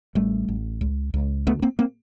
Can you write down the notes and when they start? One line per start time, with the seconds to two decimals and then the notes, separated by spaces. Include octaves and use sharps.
0.15 A1 G3 A3
0.48 A1
0.81 C#2
1.14 C#2
1.47 D2 A3 B3
1.62 A#3 C4
1.79 A#3 C4